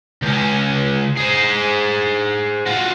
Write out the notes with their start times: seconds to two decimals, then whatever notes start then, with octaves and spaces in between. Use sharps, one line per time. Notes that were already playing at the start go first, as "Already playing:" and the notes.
0.22 C#2 C#4
1.17 G#4 C5
2.66 F4 F#4